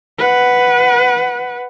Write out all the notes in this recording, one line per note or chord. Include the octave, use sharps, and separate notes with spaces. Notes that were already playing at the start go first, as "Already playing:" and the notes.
B4 F#5